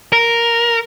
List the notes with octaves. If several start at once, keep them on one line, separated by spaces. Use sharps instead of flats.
A#4